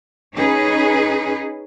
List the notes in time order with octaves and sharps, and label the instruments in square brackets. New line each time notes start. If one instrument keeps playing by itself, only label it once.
[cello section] C#4 D#4 G#4 B4